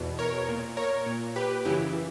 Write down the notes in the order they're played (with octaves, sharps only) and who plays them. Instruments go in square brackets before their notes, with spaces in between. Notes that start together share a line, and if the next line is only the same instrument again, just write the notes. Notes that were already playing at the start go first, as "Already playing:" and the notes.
Already playing: [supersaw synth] E2 B2
A#4 C#5
A#2
A#4 C#5
A#2
G4 B4
F#2 C#3 E3 E4 G4